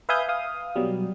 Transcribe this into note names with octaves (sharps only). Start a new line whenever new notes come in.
B4 E5 F5 G#5 D#6 G6
F5 D#6
B2 F#3 G3